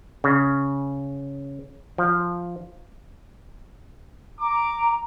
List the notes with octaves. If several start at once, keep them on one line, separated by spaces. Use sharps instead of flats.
C#3
F3
A#5 D6